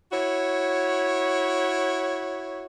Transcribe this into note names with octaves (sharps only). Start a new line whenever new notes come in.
E4 F#4 C#5